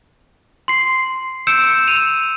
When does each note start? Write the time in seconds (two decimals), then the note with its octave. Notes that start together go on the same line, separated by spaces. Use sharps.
0.68 C6 C7
1.47 E6 G6 C#7 D7 E7
1.88 D#7 F7